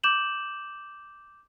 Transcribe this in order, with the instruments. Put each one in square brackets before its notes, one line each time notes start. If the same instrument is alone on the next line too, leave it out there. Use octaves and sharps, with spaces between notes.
[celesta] D6 G6 E7 F#7